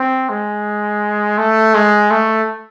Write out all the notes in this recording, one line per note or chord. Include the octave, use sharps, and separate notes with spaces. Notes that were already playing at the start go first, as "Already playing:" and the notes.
Already playing: C4
G#3
A3
G#3
A3